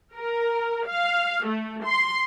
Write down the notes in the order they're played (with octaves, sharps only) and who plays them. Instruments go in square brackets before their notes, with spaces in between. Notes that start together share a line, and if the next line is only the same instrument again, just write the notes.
[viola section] A#4
F5
A3
C6